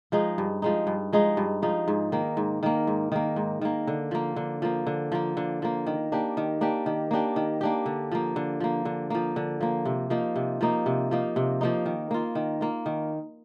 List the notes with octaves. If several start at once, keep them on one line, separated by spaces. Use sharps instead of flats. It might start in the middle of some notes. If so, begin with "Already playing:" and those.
F3 G#3 D#4
G2
F3 G#3 D#4
G2
F3 G#3 D#4
G2
F3 G#3 D#4
G#2
D#3 A#3
G#2
D#3 A#3
G#2
D#3 A#3
G#2
D#3 A#3
D3
F3 A#3
D3
F3 A#3
D3
F3 A#3
D3
F3 A#3
D#3
A#3 D4 G4
D#3
A#3 D4 G4
D#3
A#3 D4 G4
D#3
A#3 D4 G4
D3
F3 A#3
D3
F3 A#3
D3
F3 A#3
D3
F3 A#3
C3
F3 A#3 D#4
C3
F3 A#3 D#4
C3
F3 A#3 D#4
C3
F3 A#3 D#4
D#3
A#3 F4
D#3
A#3 F4
D#3